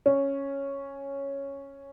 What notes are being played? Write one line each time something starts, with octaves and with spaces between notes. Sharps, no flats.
C#4